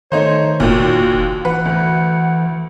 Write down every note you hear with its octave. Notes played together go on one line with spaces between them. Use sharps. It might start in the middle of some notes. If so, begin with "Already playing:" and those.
D#3 A3 D#4 C5 C#5
F1 D#2 A#2 F#4
E3 B4 F#5
D2